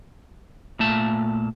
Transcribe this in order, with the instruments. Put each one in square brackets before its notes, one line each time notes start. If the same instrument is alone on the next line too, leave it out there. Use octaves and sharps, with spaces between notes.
[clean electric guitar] A#2 A3 A5